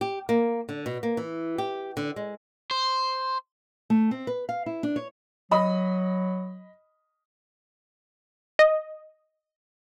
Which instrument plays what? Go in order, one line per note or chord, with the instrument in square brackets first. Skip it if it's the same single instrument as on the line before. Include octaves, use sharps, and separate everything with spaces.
[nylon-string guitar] G4
A#3
D3
B2
A#3
E3
G4
D3
G#3
[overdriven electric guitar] C5
[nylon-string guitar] A3
C4
B4
F5
E4
D4
C#5
[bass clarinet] F#3 [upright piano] D#5 B5 D#6
[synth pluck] D#5